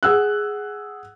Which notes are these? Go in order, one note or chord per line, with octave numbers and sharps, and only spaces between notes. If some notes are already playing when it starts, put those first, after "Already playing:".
G#4 F#5 E6 F#6